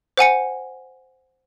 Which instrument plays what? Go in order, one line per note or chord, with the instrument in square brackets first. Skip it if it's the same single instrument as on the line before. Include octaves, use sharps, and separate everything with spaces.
[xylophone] C5 F#5 G#5 C#7